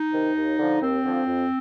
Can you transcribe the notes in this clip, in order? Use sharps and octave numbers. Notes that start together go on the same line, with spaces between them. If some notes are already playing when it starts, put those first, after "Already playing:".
Already playing: D#4
C3 D#3
D#2
D3 F3
D#2 C4
D3 F3
F2